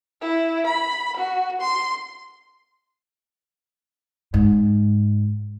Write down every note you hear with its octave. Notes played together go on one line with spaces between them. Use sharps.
E4
B5
F#4
C6
G#2